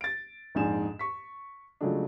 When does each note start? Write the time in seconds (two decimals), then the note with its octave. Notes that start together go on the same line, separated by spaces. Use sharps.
0.01 A6 D7
0.55 A#1 F2 G#2 G#5 E7
0.99 C#6 B6
1.81 C#3 F3 F#3 G#3 A3 D4